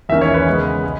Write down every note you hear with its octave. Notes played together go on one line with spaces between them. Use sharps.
E2 D#3 A#3 C#4 E5
C#5
B4
C#3 G#3 B3
G#3